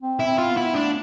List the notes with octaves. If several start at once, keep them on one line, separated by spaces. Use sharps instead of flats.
C4
E4
C4
C4 F4
B3
E4
A3 D4